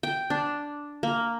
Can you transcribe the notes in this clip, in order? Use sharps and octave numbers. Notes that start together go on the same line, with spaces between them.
G5
D4
A#3